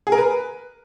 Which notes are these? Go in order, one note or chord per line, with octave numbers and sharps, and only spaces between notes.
G#4
A#4
B4